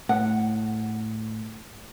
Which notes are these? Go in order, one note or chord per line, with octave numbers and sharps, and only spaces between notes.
A2 F#5